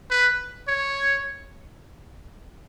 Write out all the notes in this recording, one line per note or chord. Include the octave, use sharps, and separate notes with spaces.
B4
C#5